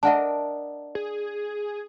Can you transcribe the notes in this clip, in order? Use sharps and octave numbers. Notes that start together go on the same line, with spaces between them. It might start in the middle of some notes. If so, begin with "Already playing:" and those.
D4 A#4 D#5 E5 F#5 A5
G#4